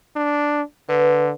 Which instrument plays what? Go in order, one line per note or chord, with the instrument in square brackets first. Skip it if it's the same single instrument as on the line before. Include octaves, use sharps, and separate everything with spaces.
[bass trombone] D4
[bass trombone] D3 [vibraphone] B4